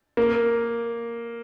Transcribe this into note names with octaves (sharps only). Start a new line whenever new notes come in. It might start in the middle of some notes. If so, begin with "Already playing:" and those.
A#3